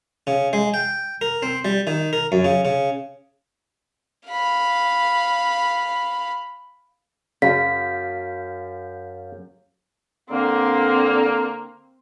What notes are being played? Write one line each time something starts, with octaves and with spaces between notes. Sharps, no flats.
C#3
G#3
G5
A#4
C4
G3
D#3
A#4
F#2
C#3
C#3
F5 B5
F#2 C#3 F5 B6
D3 A#3 C4